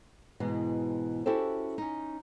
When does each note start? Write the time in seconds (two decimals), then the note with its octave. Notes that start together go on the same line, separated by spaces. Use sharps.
0.40 G#2 B2 E3 G#3
1.26 C#4 E4 F#4 G4 A4 C5
1.78 C#4 D#4